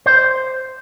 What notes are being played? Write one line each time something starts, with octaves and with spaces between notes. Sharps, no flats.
C5